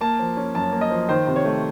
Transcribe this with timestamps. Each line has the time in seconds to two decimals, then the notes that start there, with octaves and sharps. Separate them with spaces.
0.01 A#3 A5
0.19 F3
0.37 C#4
0.55 F#2 A5
0.72 A#3
0.81 D#5
0.90 F3
1.09 D#3 C5
1.27 C3
1.36 C#5
1.45 A3